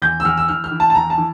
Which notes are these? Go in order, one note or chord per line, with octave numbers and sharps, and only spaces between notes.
E2 G6
E6
E2 F6
E6
E3 F6
F6
E3
A5
A5
E2 A#5
A5
E3